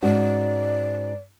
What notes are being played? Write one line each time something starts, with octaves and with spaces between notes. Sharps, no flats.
G#2 C#4 F#4 D5